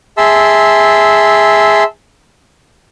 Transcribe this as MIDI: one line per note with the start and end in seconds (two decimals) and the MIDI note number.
0.17 1.83 68
0.17 1.83 76
0.17 1.83 81
0.17 1.83 84
0.17 1.83 88